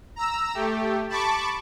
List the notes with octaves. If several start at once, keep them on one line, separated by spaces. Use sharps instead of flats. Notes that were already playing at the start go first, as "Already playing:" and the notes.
A#5 E6
A3 G4
A5 B5 C#6 D6